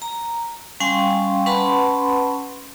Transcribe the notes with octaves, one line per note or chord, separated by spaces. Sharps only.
A#5
G3 C#4 F5 G5 G#5 C6
C#4 B4 F#5 A5 B5 C6